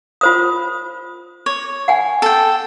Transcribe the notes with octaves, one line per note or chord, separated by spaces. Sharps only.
F4 C5 D#6
C#5
F#5 G#5
A4 G5